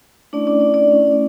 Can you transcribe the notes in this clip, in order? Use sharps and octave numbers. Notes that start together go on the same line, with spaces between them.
A3 C#4 D4 E4 D5
D4 D5
D4 D5
D4 D5
A3 C#4 E4